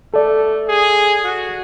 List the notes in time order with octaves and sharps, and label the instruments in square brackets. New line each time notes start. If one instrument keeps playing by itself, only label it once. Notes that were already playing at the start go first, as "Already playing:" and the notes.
[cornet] A3 [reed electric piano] A4 D5
[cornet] G#4
F#4